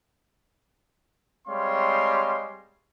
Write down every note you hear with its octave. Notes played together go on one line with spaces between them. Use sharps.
G3 G#3 C4 C#5 F5 C6